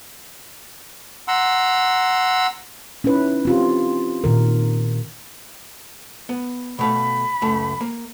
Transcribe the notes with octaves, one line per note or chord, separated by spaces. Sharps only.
F#5 A#5 C6 E6
C#4 D#4 E4 B4
C4 F4 G4
A#2 D#3 A#4
B3
B2 A3 F5 B5
C#2 F#2 A3
A#3